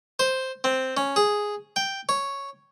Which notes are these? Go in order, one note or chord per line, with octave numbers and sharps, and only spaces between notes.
C5
C4
C#4
G#4
G5
C#5